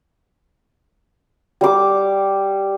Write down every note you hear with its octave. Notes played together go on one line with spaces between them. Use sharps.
G3 D6